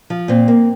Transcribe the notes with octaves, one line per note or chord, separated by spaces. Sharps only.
F3
A#2 C4
A#3